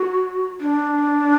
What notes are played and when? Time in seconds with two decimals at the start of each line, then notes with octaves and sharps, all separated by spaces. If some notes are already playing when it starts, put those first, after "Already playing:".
Already playing: F#4
0.61 D4